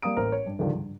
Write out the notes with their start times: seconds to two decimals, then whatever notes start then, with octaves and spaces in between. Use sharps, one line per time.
0.02 G3 A#3 F5 D#6 D7
0.17 A1 A#4 C5
0.32 C#5
0.46 G2
0.59 C#2 G#2 D3 D#3 F3 G3
0.75 G2